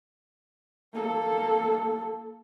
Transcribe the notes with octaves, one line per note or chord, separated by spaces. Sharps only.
A#3 A4